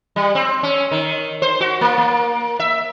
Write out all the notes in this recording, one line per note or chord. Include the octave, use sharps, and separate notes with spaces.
G3
C4
C#4
D#3
C5
F#4
A#3
A#3
E5